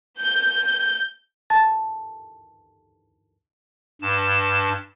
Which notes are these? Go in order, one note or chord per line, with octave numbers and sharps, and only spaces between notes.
G6
A5 A6
G2 A5